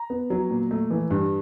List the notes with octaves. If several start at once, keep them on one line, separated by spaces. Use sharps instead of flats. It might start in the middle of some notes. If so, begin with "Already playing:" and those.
Already playing: A#5
B3
F#3
A#2
A3
E3
G2